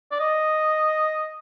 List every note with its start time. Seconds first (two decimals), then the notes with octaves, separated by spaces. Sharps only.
0.12 D5
0.20 D#5